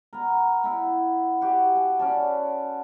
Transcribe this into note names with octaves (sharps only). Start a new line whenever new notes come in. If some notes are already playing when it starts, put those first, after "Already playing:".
B3 A#4
B3 E4
F#4 G4
G#5
C#4 D5 A5